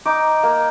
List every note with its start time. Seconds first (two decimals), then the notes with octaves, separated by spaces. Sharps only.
0.05 D#4 D6
0.43 A#3